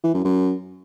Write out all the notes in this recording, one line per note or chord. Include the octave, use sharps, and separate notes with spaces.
E3
F#2
F#2